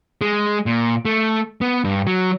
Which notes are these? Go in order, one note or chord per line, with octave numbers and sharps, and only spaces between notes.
G#3
A#2
A3
B3
G2
F#3